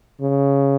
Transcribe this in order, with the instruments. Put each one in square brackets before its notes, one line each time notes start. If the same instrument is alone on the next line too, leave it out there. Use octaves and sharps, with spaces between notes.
[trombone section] C#3